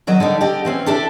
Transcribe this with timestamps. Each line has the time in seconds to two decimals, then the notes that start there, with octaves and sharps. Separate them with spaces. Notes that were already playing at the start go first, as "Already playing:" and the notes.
0.07 D#3 F#3 D#5
0.20 D3 G3 D#4
0.40 D3 G4 D#5
0.65 E3 C4 C#4
0.86 D4 E4 G4 A4